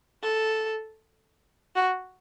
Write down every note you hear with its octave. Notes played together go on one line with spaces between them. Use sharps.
A4
F#4